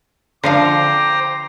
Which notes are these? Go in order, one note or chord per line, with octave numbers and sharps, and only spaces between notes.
D3 F3 C5 F5 G5 A#5 D6